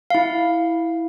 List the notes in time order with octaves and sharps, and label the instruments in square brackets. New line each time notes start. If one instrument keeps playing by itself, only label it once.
[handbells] E4 F5